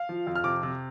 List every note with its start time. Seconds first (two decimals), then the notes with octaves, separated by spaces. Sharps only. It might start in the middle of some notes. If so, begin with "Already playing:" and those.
Already playing: F5
0.09 F3
0.27 F2
0.35 F6
0.44 C3 D6
0.63 C3